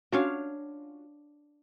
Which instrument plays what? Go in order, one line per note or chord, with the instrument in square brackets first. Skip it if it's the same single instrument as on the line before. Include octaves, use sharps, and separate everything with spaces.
[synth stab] C#4 F4 F#4 [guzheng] D4 C#5 F5